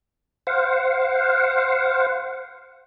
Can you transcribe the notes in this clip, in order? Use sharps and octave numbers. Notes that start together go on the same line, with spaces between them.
C5 F5 F#5